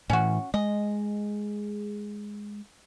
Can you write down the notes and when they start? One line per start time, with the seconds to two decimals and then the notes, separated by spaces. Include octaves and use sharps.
0.10 A2 E3 C#4 F#4
0.54 G#3 D#5